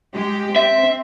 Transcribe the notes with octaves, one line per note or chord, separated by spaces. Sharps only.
G#3 G4
C4 E5